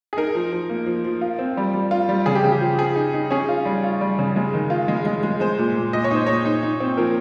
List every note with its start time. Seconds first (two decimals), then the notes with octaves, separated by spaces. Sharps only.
0.13 G#4
0.17 D#4 A#4
0.35 F3
0.52 F3
0.69 A#3
0.86 F3
1.04 F3
1.21 F4
1.39 C4
1.57 G3
1.74 G3
1.91 F4
2.09 G3
2.26 C#3 G#4
2.35 G4
2.43 C#3
2.52 G4
2.61 F3
2.78 F3 G#4
2.96 D#4
3.14 D#4
3.30 C#4 G#4
3.49 F4
3.65 G3
3.84 F4
4.01 G3
4.19 C#3
4.36 G#3
4.54 D#3
4.70 F4
4.88 G#3
5.05 G#3
5.23 G#3
5.40 G#3 C5
5.58 A#2
5.76 A#2
5.93 A#2 D#5
6.04 C#5
6.11 D#4 C5
6.26 A#2 C#5
6.45 D#4
6.63 D#4
6.80 C4
6.97 F3 A#4